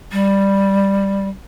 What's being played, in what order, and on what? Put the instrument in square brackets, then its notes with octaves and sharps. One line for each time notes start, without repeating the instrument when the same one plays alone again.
[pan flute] G3